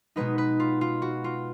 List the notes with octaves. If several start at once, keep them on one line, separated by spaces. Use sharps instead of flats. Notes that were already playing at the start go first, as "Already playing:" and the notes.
B2 G#3 B3 D#4 B4
B4
F4
F4
F#4
F4